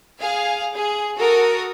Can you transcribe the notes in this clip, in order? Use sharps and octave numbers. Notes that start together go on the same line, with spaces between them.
G#4 F5
G#4
F#4 A4 A#4 D#6